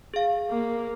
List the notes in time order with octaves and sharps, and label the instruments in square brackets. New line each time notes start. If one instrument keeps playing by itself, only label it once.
[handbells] G#4 F5
[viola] A#3